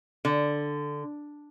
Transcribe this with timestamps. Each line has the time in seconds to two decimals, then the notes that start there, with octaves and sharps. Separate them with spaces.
0.25 D3